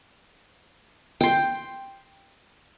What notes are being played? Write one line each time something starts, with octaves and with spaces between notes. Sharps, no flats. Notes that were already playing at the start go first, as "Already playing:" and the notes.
G5 C6